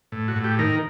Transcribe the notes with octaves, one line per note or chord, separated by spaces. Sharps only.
A2
F#4
A2
G4
D#3 A#4